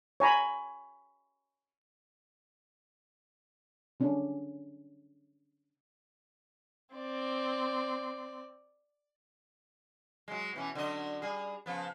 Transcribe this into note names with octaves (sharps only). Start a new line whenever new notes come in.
C#5 G#5 A#5 B5
D3 C#4 D4
C4 D5
F#3 G#3
B2 E3 C#4
D3 F#3 D#5
G3 G#4
C#3 F3 B3